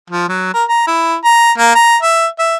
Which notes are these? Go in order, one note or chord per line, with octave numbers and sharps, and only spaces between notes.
F3
F#3
A#4
A#5
E4
A#5
A#3
A#5
E5
E5